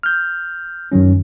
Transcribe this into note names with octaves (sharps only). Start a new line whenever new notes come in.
F6 G6
F#2 D#3 F#3 C#4